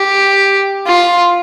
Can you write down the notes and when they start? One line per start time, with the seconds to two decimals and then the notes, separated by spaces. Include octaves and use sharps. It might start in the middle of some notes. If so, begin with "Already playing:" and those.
Already playing: G4
0.86 F4